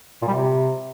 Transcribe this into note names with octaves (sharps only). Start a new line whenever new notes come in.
A#2
G3
C3